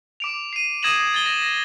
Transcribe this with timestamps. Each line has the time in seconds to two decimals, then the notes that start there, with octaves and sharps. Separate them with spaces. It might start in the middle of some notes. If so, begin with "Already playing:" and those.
0.20 D6 D7 F7
0.53 C7 D#7
0.83 D#6 G#6 A#6 D#7 E7 F#7
1.14 A6 G7
1.26 A#6
1.42 A#6